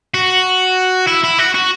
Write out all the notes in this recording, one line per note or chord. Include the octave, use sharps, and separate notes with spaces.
F#4
E4
E4
F#4
F#4